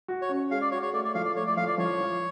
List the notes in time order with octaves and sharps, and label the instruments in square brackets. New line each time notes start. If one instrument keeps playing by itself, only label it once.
[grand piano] F#4
[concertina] C#5
[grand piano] C#4
[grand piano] G#3 [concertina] F5
[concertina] D5
[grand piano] F#4 [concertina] C#5
[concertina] C#5
[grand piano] A3 [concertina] D5
[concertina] D5
[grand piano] F3 [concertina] F5
[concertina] D5
[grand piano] A3 [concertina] C#5
[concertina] D5
[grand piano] F3 [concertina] F5
[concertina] D5
[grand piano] F3 [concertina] C#5
[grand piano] F3